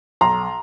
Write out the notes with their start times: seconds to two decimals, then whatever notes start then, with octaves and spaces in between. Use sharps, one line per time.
0.21 B1 A#5 C6